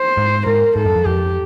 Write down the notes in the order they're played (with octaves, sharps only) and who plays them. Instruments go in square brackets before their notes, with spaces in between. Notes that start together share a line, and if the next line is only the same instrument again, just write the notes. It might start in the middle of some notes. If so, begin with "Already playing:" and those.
Already playing: [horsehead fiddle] C5
[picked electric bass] G#2
[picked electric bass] G#2 [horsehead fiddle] A#4
[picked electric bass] G#2 [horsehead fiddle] A4
[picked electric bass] F#2
F2
[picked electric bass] F2 [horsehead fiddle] G4